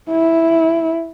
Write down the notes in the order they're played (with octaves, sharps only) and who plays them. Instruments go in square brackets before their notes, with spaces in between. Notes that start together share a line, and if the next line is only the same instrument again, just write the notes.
[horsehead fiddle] E4